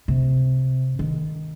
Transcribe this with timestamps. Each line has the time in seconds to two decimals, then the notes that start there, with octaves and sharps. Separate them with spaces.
0.08 C3
0.99 D#3